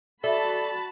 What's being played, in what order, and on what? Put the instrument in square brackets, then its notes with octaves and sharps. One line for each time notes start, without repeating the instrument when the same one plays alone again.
[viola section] F#4 A5 B5 [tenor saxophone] A4 [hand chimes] D5 [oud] E5